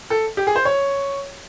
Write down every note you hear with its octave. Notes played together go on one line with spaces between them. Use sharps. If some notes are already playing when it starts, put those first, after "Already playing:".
A4
G4
G#4
C5
C#5